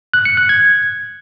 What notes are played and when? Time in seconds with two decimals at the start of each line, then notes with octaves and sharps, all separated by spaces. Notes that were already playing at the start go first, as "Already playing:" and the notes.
0.14 F#6
0.25 C#7
0.37 F#6
0.49 G#6